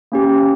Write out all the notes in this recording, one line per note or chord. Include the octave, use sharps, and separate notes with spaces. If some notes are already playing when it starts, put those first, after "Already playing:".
A#3 C#4 G4